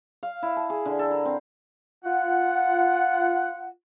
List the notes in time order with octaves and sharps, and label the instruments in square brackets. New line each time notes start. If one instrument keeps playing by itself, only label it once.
[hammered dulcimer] F5
E4
A5
G#4
D3
A4
A#4
C4
[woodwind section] F4 F#5